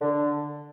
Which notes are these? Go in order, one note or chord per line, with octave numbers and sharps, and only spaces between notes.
D3